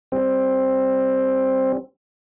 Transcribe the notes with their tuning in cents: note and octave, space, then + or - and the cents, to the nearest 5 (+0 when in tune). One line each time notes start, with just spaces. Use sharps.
G3 +10 C4 +10